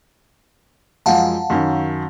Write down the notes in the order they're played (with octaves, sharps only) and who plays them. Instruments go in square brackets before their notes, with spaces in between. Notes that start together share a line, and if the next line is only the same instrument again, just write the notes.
[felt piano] F#2 F3 G#3 [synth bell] F5 F#5 A5
[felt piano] F#2 D#3 C#4